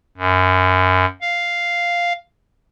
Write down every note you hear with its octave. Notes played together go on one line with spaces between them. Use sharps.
F#2
F5